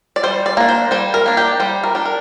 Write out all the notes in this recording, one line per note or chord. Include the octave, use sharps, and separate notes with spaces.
D5
G3 C5
D5
A#3 D4
C5
G3 C5
A#4
A#3 D4
G4
G3 C5
A#4
D4 G4
A#4